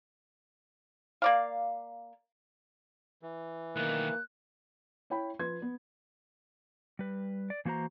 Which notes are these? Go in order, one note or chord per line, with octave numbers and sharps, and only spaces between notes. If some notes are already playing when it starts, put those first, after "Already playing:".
A#3 D5 F5
E3
B1 D#3 A#3 F#6
E4 C#5 G5 B5
F3 B4 C6 G#6
B3
G3 B4
D5
E3 A#3 F#4 C5 A#5